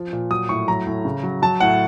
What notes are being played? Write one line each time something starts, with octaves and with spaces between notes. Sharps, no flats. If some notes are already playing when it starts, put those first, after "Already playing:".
Already playing: F3
A#2
F#3 D#6
A2 C#6
F#3 A#5
A2
C#3
F#3
F#3 A5
A2 F#5